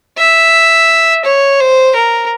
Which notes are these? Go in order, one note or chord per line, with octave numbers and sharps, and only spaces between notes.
E5
C#5
C5
A#4